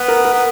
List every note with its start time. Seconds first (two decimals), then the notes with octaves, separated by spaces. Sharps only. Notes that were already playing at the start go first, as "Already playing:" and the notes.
Already playing: B3
0.08 A#4
0.25 A#4
0.34 B3